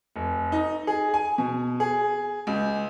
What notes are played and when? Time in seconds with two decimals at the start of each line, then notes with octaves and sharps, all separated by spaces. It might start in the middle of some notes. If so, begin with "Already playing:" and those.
0.16 F1
0.52 D#4
0.87 G#4
1.14 G#5
1.38 B2
1.80 G#4
2.47 C#2